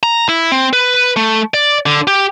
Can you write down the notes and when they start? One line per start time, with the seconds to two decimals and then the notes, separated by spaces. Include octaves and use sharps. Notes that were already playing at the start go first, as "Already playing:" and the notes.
0.03 A#5
0.29 E4
0.52 C4
0.73 B4
1.17 A3
1.54 D5
1.86 D3
2.07 G4